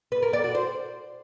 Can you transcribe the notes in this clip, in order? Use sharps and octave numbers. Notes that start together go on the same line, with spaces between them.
B4
A#4
D5
F#4
C5